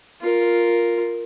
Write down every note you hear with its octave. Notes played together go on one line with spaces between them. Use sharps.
F4 A#4